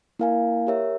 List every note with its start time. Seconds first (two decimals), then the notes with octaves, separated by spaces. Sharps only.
0.19 A#3 E4 A#4 F5 G#5
0.67 G4 A#4 C#5 E5